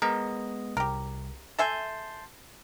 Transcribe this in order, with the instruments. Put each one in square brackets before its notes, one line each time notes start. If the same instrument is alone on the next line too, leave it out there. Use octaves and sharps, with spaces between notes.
[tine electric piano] G#3 B3 D#5 [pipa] A#4
[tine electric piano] C2 [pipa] G4 A#4
[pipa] A4 E5 G#5 [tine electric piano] A5 C6 G6